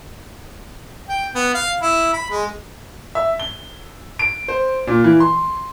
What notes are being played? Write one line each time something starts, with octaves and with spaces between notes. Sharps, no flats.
G5
B3
F5
E4
B5
G#3
E5
G7
D7
C5
A#2
E3
C6